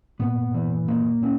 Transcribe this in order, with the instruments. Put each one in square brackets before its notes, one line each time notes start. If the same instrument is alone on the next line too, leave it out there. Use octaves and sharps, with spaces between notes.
[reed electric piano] A#2 [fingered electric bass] B3
[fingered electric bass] E3
A#3
C#4